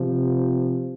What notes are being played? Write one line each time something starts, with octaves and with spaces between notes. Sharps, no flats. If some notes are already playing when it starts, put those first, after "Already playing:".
Already playing: C3 F3